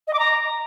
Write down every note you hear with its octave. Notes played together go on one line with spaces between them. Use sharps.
D#5
D6
A#5